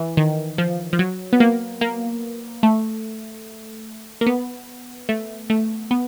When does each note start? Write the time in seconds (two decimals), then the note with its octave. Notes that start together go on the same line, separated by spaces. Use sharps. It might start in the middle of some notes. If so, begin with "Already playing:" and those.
Already playing: E3
0.17 D#3
0.58 F3
0.93 F3
0.99 F#3
1.33 B3
1.40 A#3
1.81 A#3
2.63 A3
4.21 A#3
4.26 B3
5.09 A3
5.50 A3
5.91 B3